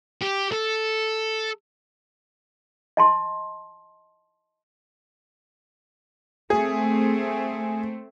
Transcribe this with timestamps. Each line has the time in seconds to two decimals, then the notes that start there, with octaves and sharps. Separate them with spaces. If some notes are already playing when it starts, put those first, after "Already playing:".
0.22 G4
0.52 A4
2.97 D#5 A5 C6
6.50 A3 C4 G#4